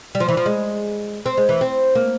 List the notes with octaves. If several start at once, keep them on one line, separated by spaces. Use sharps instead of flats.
G3
F3
E3
F3
G#3
C4
G#3
E3
C4
A#3